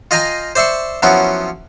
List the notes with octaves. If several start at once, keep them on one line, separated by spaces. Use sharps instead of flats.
F4 D#5 F5 G5 G#5 A#5
C5 D5 E5 C6 C#6
F3 F#3 B3 C#4 E4 F4